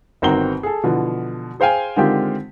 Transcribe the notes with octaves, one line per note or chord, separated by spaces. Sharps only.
G1 D#3 C4 F#4 A#5 G7
G#4 A4
B2 D3 E3 F3
G#4 C5 F5 G5 G#5
D3 D#3 G#3 C4 F4 G4